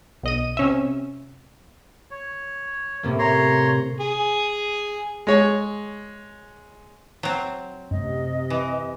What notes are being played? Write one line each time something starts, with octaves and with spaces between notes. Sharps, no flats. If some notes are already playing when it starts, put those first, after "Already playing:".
B1 D#5 D#7
C3 C#4 E5
C#5
A2 C3 A#3
C#5 A#5 C6
G#4
G#3 C#5
F#3 C4
F#2 C3 A3 D#5
E3